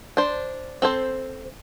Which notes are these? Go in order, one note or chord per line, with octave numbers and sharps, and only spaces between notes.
D4 C5
C4 A4 C5